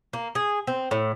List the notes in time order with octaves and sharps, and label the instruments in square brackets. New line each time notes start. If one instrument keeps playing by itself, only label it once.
[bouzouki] A#3
G#4
C4
A2